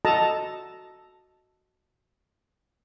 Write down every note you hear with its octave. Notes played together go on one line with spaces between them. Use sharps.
F#4 A4 D#5 A5 A#5